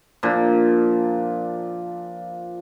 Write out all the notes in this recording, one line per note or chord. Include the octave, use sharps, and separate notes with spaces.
A#2 F3 D4